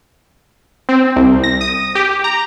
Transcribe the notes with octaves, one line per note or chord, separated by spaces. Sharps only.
C4
C2
A#6
D#6
G4
A#5